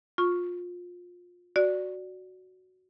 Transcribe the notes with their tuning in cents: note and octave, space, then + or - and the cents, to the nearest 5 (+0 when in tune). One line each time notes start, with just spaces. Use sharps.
F4 +25 C#6 +0
F#4 +0 D5 +0